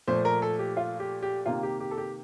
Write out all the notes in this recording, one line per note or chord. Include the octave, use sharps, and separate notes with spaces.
A#2 F3 A3 C5
A#4
A4
G4
F4
G4
G4
C3 D#3 A#3 F4
G4
G4
A4
G4